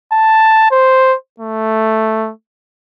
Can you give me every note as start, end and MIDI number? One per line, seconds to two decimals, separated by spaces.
0.12 0.67 81
0.71 1.15 72
1.40 2.32 57